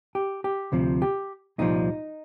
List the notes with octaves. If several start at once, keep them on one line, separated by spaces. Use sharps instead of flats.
G4
G4
D2 C3 F3
G4
C2 A#2 F3 D#4